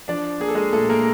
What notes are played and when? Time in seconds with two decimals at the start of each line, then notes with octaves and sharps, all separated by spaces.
0.08 F3 D4 D5
0.40 A#3 G#4
0.48 A4
0.55 G#3 G#4
0.73 A#2 A3 A4
0.89 A#3 A#4